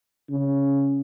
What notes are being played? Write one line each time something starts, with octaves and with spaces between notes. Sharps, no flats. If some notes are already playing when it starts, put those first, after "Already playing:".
C#3